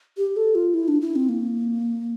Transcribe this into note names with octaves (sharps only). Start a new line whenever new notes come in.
G4
A4
F4
E4
D4
E4
C4
A#3